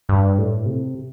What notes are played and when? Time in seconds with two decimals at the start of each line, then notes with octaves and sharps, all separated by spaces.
0.09 G2
0.38 A2
0.65 C3